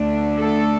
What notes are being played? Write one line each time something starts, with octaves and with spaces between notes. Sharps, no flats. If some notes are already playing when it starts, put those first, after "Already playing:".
Already playing: D2 D3 A3 D4
A3 A4